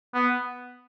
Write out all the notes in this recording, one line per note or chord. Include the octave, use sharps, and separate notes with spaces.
B3